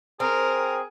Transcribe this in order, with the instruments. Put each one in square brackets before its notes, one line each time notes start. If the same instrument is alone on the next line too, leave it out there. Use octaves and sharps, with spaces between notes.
[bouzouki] C4 [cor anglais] G#4 [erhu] A#4